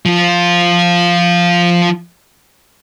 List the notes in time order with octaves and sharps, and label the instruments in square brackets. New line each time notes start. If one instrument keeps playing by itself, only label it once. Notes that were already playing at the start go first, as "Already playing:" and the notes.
[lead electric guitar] F3 F4